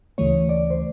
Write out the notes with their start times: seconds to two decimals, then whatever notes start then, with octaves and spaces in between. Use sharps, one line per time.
0.18 D2 C#3 E3 A3 C#5
0.49 D5
0.70 C5